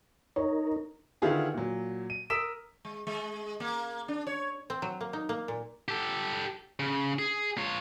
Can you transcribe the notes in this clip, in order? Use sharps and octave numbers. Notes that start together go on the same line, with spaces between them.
D#4 A#4 C#5
D3 D#3 E4 F4 G#4 B4
A#2 F#3
D#7
A#4 D#6 E6 B6 D7 E7
G#3
G#3
A#3
D4
C#5
C4
F#3
A#3
D#4
A#3
A#2
G4 A4
C#3
G#4
F4 C#5